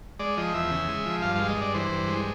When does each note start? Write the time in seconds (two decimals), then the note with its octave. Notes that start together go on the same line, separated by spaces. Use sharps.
0.20 G#3 D5
0.37 F3 D#5
0.54 E2 E5
0.71 C#3
0.89 G#3
1.06 F3
1.22 G2 F5
1.35 G#3 F5
1.48 D#5
1.57 G2 D5
1.74 E3 C5
1.92 G2
2.08 G#3